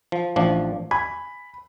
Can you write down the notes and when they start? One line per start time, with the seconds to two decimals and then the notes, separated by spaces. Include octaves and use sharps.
0.12 F3
0.36 A1 F3 D4
0.91 G#5 B5